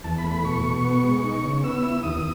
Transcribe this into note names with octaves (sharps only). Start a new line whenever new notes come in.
E2 A5
B5
A3
B5
B2 C#6
B2
B3
G#3
D#4
C#3
B3 E6
E4
D#2 D#6